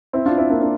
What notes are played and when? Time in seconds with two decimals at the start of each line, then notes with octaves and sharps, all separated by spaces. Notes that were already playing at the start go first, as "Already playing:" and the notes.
0.13 C4 E4
0.26 D4 F4
0.37 C4 E4
0.49 A#3 D4
0.61 A#3 D4